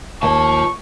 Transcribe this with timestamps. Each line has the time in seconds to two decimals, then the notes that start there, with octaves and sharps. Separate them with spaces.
0.23 D#2 F4 A5 C#6